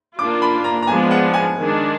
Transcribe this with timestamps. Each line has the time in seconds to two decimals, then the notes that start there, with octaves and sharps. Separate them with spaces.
0.18 A#3 D4 F4 D6
0.42 B5
0.64 A#5
0.82 A#5
0.87 F3 G#3 B3 D4 G#5
1.11 F#5
1.34 G#5
1.57 D#3 G#3 D4